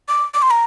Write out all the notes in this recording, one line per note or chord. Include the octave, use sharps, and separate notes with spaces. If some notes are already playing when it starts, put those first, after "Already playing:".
D6
D6
C6
A#5